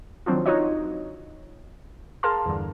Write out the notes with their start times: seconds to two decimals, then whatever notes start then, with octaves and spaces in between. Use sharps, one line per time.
0.26 D#3 F3 F#3 C4 D4 F4
0.46 D#4 F4 F#4 C#5 D#5
2.23 G#4 A#4 F5 A5 A#5 C6
2.46 E2 G2 D3